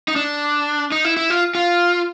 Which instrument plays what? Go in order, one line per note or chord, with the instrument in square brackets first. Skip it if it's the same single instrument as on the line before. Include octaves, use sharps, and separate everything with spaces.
[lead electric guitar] D#4
D4
D#4
E4
E4
F4
F4